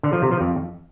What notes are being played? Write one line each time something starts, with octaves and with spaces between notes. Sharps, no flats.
D3
F3
C3
F3
F2